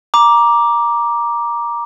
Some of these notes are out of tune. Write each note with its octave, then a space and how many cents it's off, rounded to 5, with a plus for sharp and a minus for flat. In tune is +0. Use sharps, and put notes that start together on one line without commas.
A#5 +15 D6 +0